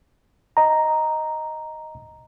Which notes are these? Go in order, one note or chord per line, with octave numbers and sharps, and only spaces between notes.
D#5 A#5